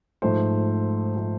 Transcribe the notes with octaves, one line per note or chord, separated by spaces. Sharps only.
G#2 F3 A3 C5
F3 A3